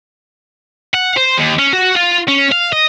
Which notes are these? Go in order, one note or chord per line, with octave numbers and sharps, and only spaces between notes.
F#5
C5
D#2
C#4
F#4
F4
C#4
F5
D#5